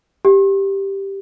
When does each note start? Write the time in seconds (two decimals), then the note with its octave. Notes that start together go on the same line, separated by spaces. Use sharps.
0.25 G4